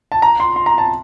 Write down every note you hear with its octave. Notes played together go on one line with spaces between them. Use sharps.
A5
A#5
C6
C6
A#5
A5